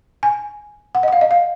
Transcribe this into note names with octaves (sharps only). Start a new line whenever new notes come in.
G#5
F#5
D#5
F#5
F5
D#5
F5